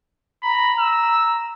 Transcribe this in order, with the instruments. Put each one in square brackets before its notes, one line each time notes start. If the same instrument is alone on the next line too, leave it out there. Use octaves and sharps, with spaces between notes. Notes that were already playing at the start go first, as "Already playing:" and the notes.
[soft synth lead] A#5 [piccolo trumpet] B5
[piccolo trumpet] E6